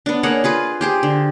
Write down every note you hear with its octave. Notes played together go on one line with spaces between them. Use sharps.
B3 D4
A#3 G#4 C#5 F#5
F4 G#4 B4
G4 G#4 C5
D3